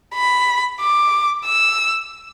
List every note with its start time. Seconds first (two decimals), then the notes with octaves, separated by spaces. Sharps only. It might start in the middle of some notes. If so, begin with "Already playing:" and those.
0.14 B5
0.80 D6
1.45 E6